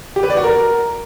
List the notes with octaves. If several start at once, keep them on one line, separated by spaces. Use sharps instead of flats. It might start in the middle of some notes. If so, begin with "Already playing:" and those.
G4
B4
D5
F#4
A#4